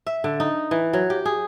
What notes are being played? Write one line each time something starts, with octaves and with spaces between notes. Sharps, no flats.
E5
D3
D#4
E3
F#3
G4
G#4